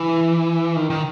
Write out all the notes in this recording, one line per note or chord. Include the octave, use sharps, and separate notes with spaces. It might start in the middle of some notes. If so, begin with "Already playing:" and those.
Already playing: E3
D#3
D#3